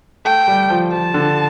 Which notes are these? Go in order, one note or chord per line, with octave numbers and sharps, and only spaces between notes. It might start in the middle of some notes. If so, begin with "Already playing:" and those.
A3 G5
G3
F3
F3 A5
D3